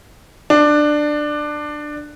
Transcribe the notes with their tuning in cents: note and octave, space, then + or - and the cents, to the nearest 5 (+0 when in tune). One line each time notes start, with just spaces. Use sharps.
D4 +15